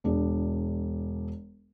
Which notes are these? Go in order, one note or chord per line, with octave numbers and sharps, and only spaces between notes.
E1 D4 G#4